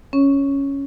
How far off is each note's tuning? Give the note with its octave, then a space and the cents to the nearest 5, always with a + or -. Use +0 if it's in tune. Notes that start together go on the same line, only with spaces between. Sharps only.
C#4 +0 C#5 +0